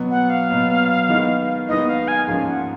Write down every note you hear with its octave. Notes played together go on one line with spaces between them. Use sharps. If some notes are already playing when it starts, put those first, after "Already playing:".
Already playing: B2 F#3 B3
F#5
F5
B2 F#3 B3
D#3 G#3 B3 D#4
D#3 G#3 B3 D#4 D#5
F5
G#5
G#2 F3 A#3 C#4 F5
F#5